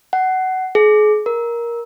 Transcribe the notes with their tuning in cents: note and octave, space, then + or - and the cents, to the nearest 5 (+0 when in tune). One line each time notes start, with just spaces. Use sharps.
F#5 +20
G#4 +35
A#4 +10